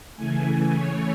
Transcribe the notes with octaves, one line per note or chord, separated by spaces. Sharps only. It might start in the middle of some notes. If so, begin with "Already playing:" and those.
C#3 E3 A3 G#5
C#5